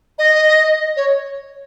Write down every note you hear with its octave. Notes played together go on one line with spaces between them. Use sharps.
D#5
C#5